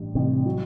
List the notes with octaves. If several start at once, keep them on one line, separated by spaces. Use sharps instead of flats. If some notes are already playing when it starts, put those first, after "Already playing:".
Already playing: A1 G2
A1 C3
F#3